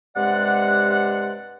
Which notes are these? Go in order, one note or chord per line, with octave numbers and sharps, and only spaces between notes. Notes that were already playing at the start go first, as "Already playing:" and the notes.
G2 C3 G#3 D5 F#5